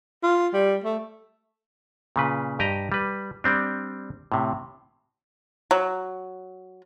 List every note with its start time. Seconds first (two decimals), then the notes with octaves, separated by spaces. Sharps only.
0.23 F4
0.53 G3
0.84 A3
2.16 A#2 C#3 B4
2.59 G2 G4 D#5 A#5
2.92 G3 B4
3.44 G3 C4 D4
4.32 A2 C3
5.71 F#3